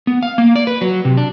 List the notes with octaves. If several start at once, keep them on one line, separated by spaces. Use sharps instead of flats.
B3
F5
A#3
D5
B4
F#3
C3
D4